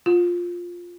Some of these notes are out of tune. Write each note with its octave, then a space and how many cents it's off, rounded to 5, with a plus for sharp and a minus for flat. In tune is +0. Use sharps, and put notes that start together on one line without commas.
F4 +5